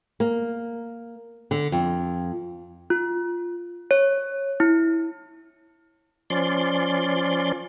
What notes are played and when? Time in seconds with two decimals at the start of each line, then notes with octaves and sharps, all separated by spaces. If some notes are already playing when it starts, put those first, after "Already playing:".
0.20 A#3
1.51 D3
1.72 F2
2.90 F4
3.91 C#5
4.60 E4
6.30 F3 C#4 D5 C6